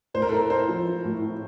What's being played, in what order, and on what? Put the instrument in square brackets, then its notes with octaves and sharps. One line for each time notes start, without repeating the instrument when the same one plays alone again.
[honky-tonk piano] A2 [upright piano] C5
[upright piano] A#4
A4
[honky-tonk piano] E4 [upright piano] A#4
[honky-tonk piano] E4 [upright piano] C5
[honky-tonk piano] F3
F3
A2
E4